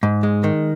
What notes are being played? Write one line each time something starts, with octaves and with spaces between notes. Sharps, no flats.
G#2
G#3
D#3